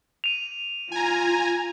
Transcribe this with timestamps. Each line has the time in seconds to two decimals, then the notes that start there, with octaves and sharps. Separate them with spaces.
0.24 D#7 F7
0.92 F4 G#5 A#5